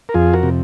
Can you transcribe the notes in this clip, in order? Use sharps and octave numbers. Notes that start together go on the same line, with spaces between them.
A#4
F2 F4 G#4
F#4 A#4
C3